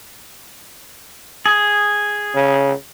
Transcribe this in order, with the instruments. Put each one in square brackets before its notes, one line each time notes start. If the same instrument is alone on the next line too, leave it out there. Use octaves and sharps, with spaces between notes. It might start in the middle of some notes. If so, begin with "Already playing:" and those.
[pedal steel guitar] G#4
[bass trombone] C#3